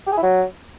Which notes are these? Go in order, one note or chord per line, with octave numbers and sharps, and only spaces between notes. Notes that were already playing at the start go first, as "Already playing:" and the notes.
G4
G#4
E4
F#3